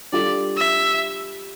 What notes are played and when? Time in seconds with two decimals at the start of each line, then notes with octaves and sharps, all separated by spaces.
0.12 G3 D4 F4 A4 D5
0.57 E5